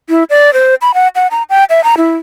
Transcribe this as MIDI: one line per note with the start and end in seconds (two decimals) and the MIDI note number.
0.09 0.24 64
0.30 0.53 74
0.54 0.75 72
0.82 0.92 83
0.94 1.08 78
1.15 1.27 78
1.31 1.43 82
1.50 1.64 79
1.70 1.84 76
1.84 1.95 82
1.97 2.16 64